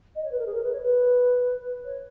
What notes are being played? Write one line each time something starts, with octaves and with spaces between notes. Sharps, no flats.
D#5
C#5
B4
A#4
G#4
A#4
B4
C#5
B4
C#5